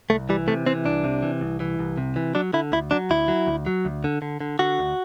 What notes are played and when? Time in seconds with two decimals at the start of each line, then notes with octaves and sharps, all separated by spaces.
0.10 C2 A3
0.29 E3 G3
0.48 C3 A3
0.66 E3 C4
0.85 C2 D4
1.04 C3
1.23 E3
1.41 C2
1.60 E3
1.79 C2
1.97 C3
2.16 E3
2.35 F#3 D4
2.53 D3 E4
2.72 D2 E4
2.91 F#3 D4
3.10 D2 E4
3.28 F#3
3.47 D2
3.66 F#3
3.85 D2
4.04 D3
4.22 D3
4.40 D3
4.59 D3 F#4
4.79 D2